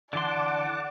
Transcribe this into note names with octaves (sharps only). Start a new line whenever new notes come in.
D3 E3 D5 F#5 A5 C6 D6